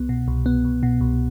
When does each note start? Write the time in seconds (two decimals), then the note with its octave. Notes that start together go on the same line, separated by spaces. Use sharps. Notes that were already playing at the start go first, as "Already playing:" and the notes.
Already playing: C2 B3
0.09 B2
0.28 C2
0.46 B3
0.64 C2
0.83 B2
1.01 C2